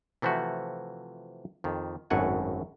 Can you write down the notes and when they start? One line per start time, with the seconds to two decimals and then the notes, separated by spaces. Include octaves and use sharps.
0.22 C3 E3 F3 A3 F#4
1.64 F2 D#3
2.10 G#1 F#2 A2 F#5 G#5